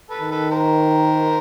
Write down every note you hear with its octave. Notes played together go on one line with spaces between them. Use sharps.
A4 B4
D#3
A4 B4
A#4 C5